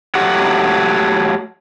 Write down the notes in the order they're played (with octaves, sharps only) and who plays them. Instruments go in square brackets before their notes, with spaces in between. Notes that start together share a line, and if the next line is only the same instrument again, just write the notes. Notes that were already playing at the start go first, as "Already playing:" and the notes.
[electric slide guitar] F#3 A3 G4 F#5